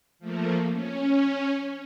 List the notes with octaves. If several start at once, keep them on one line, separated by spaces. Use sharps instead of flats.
F3 A3 A#3
C#4